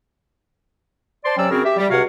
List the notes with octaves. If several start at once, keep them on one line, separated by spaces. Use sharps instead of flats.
C5 D5 A5 C6
C3 F#3 C#4 D5 G5 E6
C#3 C4 F#4 G#4 A#4
G4 E5
G3
C#2 C3 F#4 C#5 F5 F#5